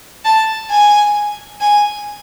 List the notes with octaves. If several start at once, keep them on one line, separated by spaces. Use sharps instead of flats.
A5
G#5
G#5